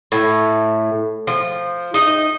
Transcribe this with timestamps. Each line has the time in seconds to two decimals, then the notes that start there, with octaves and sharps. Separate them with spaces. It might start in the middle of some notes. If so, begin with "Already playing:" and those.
0.12 A2
1.27 F3
1.94 D#4 D#5